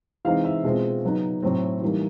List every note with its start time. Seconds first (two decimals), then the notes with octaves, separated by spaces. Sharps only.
0.25 E3 G#3 C4 D#4 F5
0.45 E5
0.63 B2 G#3 C4 F4
1.04 C#3 F#3 B3 D#4
1.43 A2 F#3 A3 C4
1.81 E3 G3 A#3 D#4